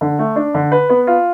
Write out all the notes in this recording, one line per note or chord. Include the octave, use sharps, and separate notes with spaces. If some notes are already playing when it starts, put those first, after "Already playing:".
D3
A3
D4
D3
B4
B3
F4